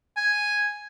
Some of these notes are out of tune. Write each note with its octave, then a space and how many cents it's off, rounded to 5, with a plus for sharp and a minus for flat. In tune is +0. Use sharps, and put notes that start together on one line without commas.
G#5 +0